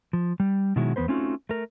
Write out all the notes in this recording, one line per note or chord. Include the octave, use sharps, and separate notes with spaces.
F3
G3
B2 D#3 F#3 G#3 E4 F#4
E2 G#2 B3 B4 C5
A3 C4 C#4 D#4 F4 F#4
A3 A#4